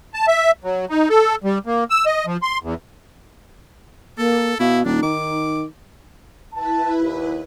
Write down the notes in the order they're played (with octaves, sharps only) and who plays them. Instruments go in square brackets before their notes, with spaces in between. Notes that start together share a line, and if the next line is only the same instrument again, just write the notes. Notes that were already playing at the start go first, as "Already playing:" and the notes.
[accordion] A5
E5
F#3
D#4
A4
G3
A#3
E6
D#5
F3
C6
E2
[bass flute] A#3 [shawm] A4
[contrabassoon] B2 [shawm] E4 [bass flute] F5
[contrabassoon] D#1 [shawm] D4 [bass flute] D#4
[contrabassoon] D#3 [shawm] D6
[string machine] E4 B4 [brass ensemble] A5
[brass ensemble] D#2